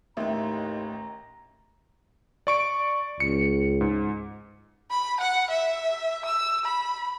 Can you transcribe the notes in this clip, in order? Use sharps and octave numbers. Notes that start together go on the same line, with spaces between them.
A1 D#2 A2 E5 A#5
D5 C#6 D7
C#2 C#7
G#2
B5
F#5
E5
E6
B5